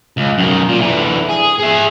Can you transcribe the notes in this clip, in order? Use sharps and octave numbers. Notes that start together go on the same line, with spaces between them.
C#2
F#2 D#3
A#2
D3 E3
G#4
G#4 E5